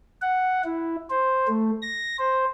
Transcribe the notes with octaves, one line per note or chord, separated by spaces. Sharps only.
F#5
E4
C5
A3
A#6
C5